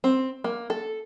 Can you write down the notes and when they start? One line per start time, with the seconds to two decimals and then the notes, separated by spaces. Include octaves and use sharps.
0.04 C4
0.44 A#3
0.70 A4